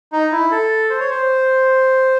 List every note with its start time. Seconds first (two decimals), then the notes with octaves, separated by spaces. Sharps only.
0.12 D#4
0.32 E4
0.51 A4
0.90 C5
1.00 C#5
1.10 C5